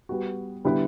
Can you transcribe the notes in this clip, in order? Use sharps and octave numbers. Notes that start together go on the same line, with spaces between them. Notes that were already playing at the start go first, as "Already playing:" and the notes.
G3 B3 F#4
D3 G3 B3 E4 B4